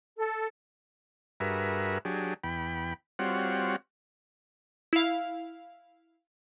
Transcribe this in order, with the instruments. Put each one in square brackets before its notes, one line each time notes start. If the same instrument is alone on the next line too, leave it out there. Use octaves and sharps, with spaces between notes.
[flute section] A4
[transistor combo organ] G2 F#4 G#4 A#4 B4 E5
F#3 D4 G4 G#4
E2 G5 B5
G3 C4 F4 F#4 C#5 F#5
[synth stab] E4 F5